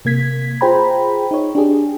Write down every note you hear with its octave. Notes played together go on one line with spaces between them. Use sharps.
C3 A#3 G#6 B6
F4 G#4 C5 G5 A#5 B5
D#4 C#5
D4 G4 G#4